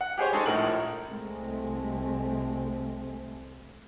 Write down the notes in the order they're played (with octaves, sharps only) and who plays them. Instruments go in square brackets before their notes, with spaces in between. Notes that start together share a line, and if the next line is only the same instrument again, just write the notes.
[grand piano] F#5
G4 G#4 C5 C#5
G#3 C#4 D#4 G#4 A4
A#1 A2 A4 A#4 F#7
[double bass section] C2 G#3 A3 C4